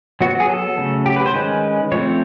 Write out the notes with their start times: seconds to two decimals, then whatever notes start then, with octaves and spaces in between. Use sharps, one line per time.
0.21 F#3 B3 F#4
0.40 G#4
0.49 A4
0.78 C#3 F#3 A3
1.06 G4
1.16 B4
1.26 C5
1.34 D#3 G#3 C#4 B4
1.92 F3 A3 C4 C#5